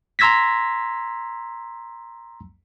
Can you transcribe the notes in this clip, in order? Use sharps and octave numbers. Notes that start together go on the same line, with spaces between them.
A#5 C6 E6 G#6 A#6 B6